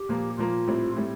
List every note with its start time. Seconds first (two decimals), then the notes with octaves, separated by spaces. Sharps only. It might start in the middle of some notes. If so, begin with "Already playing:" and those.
Already playing: G4
0.09 A#2 F3 A#3
0.38 A#2 F3 A#3 F4
0.67 A2 G3 C4
0.96 A2 G3 C4